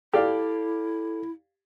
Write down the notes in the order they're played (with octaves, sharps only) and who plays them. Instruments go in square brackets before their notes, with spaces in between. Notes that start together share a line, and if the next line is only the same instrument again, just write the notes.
[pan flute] E4 [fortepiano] G4 D5 F5 [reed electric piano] A4